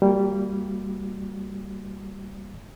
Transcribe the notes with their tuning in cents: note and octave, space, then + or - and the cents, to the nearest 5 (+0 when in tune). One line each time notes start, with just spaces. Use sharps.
G3 +0 A#3 -25 F#4 -20